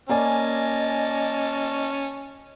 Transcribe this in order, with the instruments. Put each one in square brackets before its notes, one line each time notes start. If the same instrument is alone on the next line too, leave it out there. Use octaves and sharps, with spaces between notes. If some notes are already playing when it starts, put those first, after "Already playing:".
[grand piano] A#3 D5 G#5 [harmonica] C#4 A5 [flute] D#5